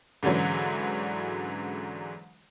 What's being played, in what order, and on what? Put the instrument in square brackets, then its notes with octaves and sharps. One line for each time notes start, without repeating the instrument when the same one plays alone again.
[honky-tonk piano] G#2 D3 E3 F#3 C#4